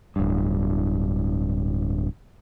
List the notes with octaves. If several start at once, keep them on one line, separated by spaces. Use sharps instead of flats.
D1 G2